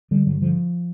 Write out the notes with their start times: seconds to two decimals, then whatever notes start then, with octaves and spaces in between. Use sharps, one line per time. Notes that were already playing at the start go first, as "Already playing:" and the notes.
0.11 D3 G3
0.26 G2 F#3
0.41 D3 F3